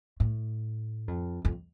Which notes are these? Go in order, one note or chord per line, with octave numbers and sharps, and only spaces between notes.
A2
F2
F2